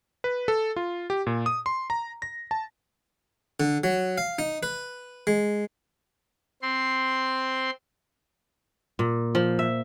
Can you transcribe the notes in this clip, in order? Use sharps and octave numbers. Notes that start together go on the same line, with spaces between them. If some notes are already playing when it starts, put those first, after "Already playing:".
B4
A4
F4
G4
A#2
D#6
C6
A#5
A#6
A5
D3
F#3
F5
D#4
B4
G#3
C4 C6
A#2
F3
E5